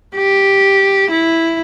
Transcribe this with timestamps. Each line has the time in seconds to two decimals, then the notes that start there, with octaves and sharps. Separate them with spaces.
0.15 G4
1.11 E4